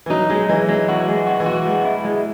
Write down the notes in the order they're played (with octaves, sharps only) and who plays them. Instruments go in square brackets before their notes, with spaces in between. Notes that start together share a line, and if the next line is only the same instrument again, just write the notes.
[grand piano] E3
[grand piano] F#3 [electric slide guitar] D#4
[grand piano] F#3 [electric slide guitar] G#3
[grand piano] E3 [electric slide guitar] G#3
[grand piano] F#3 [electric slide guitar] G#3
[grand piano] E3 [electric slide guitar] F#4
[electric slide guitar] G#3
F#4
[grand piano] E3
[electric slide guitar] F#4
G#3
E4
G#3